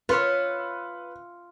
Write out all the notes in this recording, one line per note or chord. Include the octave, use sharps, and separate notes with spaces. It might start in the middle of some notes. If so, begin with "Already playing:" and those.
F4 B4 C#5 E5